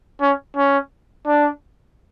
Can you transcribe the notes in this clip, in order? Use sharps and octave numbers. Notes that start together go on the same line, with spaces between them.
C#4
C#4
D4